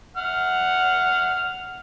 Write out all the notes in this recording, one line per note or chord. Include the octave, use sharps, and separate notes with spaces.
F#5 F6